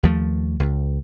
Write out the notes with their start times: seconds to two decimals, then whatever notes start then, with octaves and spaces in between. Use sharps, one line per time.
0.03 D#2 F3 A3
0.60 C#2